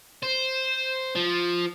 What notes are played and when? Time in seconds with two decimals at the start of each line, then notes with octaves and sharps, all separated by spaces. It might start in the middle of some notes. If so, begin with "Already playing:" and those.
0.23 C5
1.16 F3